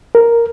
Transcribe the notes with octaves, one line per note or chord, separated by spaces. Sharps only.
A#4